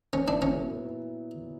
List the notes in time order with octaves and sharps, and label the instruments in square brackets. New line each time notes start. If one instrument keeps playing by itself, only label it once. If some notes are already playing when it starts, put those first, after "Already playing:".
[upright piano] B3 [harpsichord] C#4
[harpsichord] D4 [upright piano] E4
[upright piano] A#2 [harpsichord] C#4
[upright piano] F#3
B3
E4